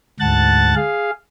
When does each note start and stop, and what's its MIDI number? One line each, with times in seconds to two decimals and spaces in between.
0.20 0.74 38
0.20 0.74 44
0.20 0.74 78
0.20 0.74 81
0.20 0.74 90
0.20 0.74 93
0.75 1.11 68
0.75 1.11 77